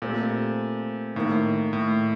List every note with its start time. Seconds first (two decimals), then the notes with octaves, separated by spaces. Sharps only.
0.02 A#2 A3 C4 G4
1.15 A2 D#3 A#3 D#4
1.73 A2